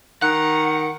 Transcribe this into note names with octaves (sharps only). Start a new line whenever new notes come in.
D#3 F#5 A#5 F#6